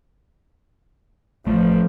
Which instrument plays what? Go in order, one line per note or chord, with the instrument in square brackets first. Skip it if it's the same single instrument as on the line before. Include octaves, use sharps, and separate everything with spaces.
[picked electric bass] A1 A3 [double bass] F3